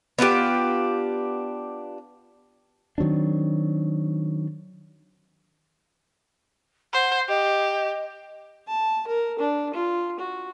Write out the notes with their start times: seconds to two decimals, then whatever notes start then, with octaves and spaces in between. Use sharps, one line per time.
0.19 B3 D4 F4 G4
2.98 D#3 F#3 C4 D4
6.94 C5 F#5
7.29 G4 D#5
8.67 A5
9.07 A#4
9.39 D4
9.74 F4
10.19 F#4